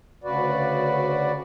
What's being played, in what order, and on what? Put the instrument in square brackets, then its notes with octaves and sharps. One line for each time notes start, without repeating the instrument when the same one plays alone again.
[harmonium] D2 C#3 F#4 B4 D5